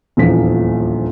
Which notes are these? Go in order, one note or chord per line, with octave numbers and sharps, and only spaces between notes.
D#1 A#1 E2 F3 B6